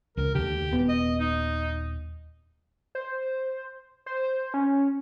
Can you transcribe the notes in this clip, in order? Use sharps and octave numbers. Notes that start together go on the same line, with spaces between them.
C#2 A#4
D#2 D3 G4
D#1 B3
D#5
D#4
C5
C5
C#4